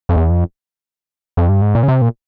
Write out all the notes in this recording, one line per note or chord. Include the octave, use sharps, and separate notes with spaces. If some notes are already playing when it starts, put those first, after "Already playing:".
F2
E2
F2
F2
G2
G#2
A#2
C#3
C3
A#2